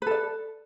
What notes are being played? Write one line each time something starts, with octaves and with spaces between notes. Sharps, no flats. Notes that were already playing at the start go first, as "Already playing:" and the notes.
A4 B4 D5